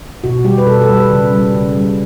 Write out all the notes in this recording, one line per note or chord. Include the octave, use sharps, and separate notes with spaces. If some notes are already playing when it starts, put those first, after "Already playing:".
B2 F#4
G3 G4
B4
B2 A4
A4
G3
B4
C#3
G3
C#3
G3